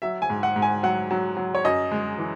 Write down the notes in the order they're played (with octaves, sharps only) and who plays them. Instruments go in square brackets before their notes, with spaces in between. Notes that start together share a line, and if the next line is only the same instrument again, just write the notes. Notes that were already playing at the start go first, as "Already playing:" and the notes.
[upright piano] F#3 E5
G#5
G#2
F#5
G#2
G#5
F#3 F#5
F#3
F#3
C#5
F#2 D#5
G#3
E3